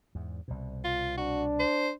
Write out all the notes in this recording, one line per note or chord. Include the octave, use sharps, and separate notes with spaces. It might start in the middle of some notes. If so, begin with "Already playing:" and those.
E2 G#2
C2 B2
F4
D4 F#4
C5